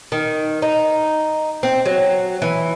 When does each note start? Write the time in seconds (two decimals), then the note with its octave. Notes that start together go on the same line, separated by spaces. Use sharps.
0.12 D#3
0.62 D#4
1.63 C4
1.86 F#3
2.42 E3